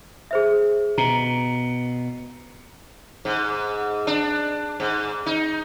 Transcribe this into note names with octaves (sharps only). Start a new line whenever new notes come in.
G#4 C5 E5
B2 A#5
G#2
D4
G#2
D#4